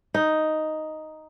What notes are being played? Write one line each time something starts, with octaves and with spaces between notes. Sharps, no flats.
D#4